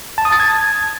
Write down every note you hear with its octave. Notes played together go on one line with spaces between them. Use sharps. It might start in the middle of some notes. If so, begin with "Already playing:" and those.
A5
D#6
A6
G#6